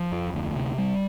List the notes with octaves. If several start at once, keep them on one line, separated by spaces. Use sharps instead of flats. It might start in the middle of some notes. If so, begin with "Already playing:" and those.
Already playing: F3
F2
D2
C3
G3